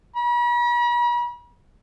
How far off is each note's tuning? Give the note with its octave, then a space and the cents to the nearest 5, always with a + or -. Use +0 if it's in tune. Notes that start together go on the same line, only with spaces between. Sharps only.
B5 -45